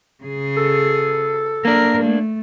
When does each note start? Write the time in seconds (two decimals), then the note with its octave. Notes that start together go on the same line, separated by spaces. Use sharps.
0.24 C#3 G#4
0.57 A4
1.65 A#3 D4 A#4
2.03 A3